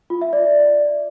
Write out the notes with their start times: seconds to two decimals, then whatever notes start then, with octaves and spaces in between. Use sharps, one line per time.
0.10 F4
0.22 E5
0.33 D5